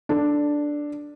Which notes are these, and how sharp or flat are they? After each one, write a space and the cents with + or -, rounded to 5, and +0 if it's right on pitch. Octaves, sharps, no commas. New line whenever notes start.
D4 +0 A4 +0